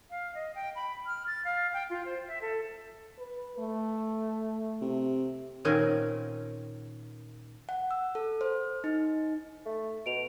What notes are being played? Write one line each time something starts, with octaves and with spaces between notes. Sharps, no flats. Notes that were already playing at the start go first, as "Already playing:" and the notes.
F5
D#5
G5
B5
F6
A6
F5
G5
F4
C5
E5
A4
B4
A3
C3
A#2 D#3 C4 C#4 G#4 A#4
F#5
E6
A4
C5
D#4
A3
B2 D7 F7